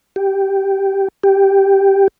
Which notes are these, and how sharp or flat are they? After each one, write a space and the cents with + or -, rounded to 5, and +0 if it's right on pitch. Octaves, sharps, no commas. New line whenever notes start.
G4 -5
G4 +0